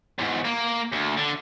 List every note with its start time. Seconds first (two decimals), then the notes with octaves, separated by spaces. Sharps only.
0.19 E2 G#2
0.45 A#3
0.92 D2
1.18 D3